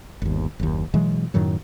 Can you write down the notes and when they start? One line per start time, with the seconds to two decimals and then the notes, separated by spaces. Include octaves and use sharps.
0.22 G1 D#2
0.59 F#1 D#2
0.94 B2 E3 F#3 G#3
1.34 F#2 A2 D#3 F#3